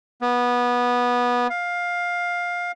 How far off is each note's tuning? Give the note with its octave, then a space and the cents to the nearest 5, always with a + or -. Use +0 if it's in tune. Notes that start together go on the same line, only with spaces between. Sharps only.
B3 -15
F5 +15